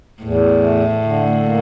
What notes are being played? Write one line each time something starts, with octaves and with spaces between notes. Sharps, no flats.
E2 A2
A3
D3
A#3